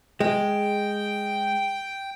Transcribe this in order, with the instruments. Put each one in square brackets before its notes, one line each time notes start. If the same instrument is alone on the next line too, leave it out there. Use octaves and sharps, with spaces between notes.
[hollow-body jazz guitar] G#3 [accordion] G5